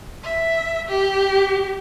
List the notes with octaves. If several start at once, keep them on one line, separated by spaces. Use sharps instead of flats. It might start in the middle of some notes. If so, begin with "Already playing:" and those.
E5
G4